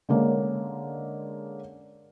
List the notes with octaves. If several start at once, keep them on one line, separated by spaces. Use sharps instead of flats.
D3 G#3 A#3 C#4